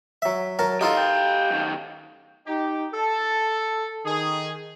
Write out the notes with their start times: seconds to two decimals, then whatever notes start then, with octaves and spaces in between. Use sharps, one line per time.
0.22 F#3 E5
0.59 F#3 A#4 A5
0.81 D#4 F4 G4 A4 F5
0.97 G5
1.50 F#2 D#3
2.47 D#4 G4
2.94 A4
4.06 D#3 G#4